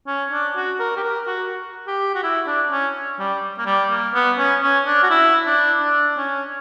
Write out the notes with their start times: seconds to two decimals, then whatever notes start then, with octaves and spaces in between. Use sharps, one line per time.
0.07 C#4
0.32 D4
0.56 F#4
0.80 A#4
0.97 G4
1.04 A#4
1.27 F#4
1.87 G4
2.15 F#4
2.23 E4
2.47 D4
2.71 C#4
3.19 G3
3.59 A#3
3.66 G3
3.91 A#3
4.14 B3
4.38 C#4
4.63 C#4
4.86 D4
5.03 F#4
5.10 E4
5.46 D4
5.82 D4
6.17 C#4